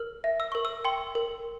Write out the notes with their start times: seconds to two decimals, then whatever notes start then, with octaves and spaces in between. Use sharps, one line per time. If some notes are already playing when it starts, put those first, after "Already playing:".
Already playing: A#4 F6
0.24 E5
0.40 E6
0.52 A#4 C#6
0.65 E6
0.85 G5 C6
1.15 A#4